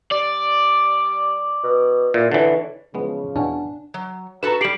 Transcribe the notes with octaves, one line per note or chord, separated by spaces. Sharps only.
G3 D5
B2
A#2 E4
D3 E3 C#4
C#3 E3 F3 G#3 B3
E2 B2 C#4 D4 F#5 G#5 A5
F#3
F#4 A4 B4 A#5 E7
G3 G4 C7 D7 F#7